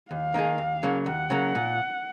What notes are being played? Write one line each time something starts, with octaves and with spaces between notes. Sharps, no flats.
D#2 F5
D#3 A#3 D#4 G#4
D#2
C#3 F#3 A#3
D#2 F#5
C#3 F#3 A#3
A#2